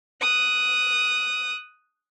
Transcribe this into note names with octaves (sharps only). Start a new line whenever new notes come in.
D#6 F#6